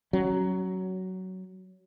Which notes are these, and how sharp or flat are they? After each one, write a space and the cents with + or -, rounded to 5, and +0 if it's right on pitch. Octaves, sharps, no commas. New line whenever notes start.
F#3 +15 C#4 -15